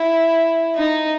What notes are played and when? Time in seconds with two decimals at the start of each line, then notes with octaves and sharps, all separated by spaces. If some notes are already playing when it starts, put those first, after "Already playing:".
Already playing: E4
0.75 D#4